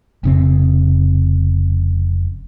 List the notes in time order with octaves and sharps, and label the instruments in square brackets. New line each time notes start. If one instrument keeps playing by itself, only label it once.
[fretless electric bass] F1 C#3 C4